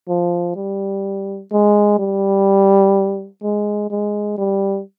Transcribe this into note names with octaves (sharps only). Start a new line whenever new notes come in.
F3
G3
G#3
G3
G#3
G#3
G3